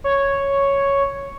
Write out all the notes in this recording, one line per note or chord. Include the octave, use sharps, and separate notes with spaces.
C#5